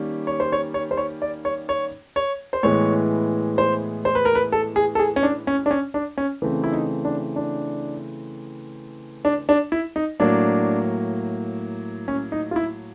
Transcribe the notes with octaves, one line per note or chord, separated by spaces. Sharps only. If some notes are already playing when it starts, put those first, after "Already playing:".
Already playing: D#3 G3 A#3 C#4
C#5
C5
C#5
C#5
C5
C#5
D5
C#5
C#5
C#5
C5
A2 E3 G#3 B3 C#5
C5
C5
B4
A#4
B4
A4
G#4
A4
G#4
C#4
D4
C#4
D4
C#4
D4
C#4
C#3 E3 A3 C4
E4
D#4
D4
D4
D4
D4
E4
D#4
A2 F#3 A#3 D4
C#4
D#4
F4
E4